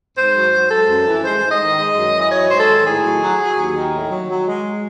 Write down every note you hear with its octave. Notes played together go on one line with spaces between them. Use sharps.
G#2 C5
F#3
F#3
G#3 A4
F#2
E3
G#3 C5
G#2
D#5
D#3
G#3
F#2
E3
D#5
F#3 C#5
G#2 C5
A4
D#3
A2 G#4
F#3
F#3
F#3
D#2
D#3
A2
F#3
F#3
G#3